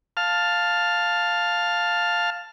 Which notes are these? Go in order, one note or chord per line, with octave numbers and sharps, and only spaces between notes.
F5 A5 F6